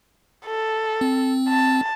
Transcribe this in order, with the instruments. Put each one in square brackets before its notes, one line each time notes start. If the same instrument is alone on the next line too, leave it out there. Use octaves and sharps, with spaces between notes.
[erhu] A4
[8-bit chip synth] C4
[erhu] A5